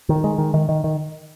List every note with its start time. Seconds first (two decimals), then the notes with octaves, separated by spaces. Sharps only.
0.09 D#3
0.24 G#3
0.38 D#3
0.54 D#3
0.69 D#3
0.84 D#3